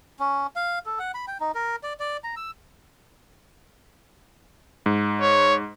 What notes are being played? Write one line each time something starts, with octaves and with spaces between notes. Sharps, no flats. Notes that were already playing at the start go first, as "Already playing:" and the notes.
C#4
F5
A4
F#5
B5
G5
D#4
A#4
D5
D5
A#5
E6
G#2
C#5